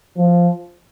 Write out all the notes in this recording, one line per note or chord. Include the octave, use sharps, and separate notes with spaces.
F3